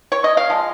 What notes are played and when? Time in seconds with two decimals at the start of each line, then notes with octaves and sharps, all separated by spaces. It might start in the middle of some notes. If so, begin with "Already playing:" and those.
0.12 C#5
0.24 D#5
0.37 F5
0.50 F3 G#3